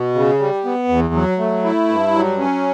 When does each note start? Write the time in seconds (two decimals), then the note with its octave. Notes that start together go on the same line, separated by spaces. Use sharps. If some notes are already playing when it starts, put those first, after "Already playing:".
Already playing: B2
0.15 C#3
0.39 G3
0.65 B3
0.89 E2
1.14 F#3
1.39 A3
1.64 E4
1.88 G2
2.14 F#3
2.39 C#4